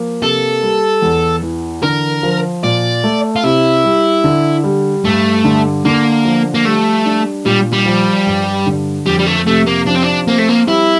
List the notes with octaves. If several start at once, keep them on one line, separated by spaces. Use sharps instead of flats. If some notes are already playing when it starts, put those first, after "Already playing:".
Already playing: F3 A#3
C3 A4
G3
E2
E3
D3 A#4
F3
A#2 D5
A3
F4
C3 E4
G3
D3
G3
G2 A3
D3
D3 A#3
F3
A#3
G3 A3
D4
A#2 G3
G3
F3
G2
D3
F2 G3
G3
A3
C3 A3
A#3
F3 D4
C4
D4
A#3 C4
A3
A#3
G3 E4